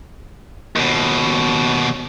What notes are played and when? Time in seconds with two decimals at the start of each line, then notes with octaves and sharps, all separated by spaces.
0.76 D#2 B2